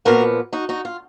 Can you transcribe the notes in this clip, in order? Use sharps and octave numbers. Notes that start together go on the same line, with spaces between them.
A#2 F3 B3 F#4 A#4
D#4 F#4
D#4 F#4
F4